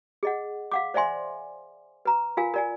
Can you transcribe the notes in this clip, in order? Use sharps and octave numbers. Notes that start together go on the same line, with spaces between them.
G#4 D#5 F#5
F5 F#5 D6
C5 D5 E5 G#5 C6
B4 A#5
F4 A#4 F5 G#5
A#4 D5 G#5